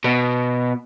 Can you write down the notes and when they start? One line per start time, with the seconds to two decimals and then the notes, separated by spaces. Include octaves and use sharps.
0.04 B2